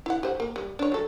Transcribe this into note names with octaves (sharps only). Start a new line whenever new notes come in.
E4 F#5
G4 C5 F#5
A#3
G3
D4 C#5
F#3 A4